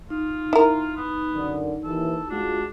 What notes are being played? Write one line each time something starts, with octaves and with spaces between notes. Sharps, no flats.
D#4 F4
E4 A#4
B3
F#2 D3 D#3
D#2 E3 A4
G#3 D4 F4 F#4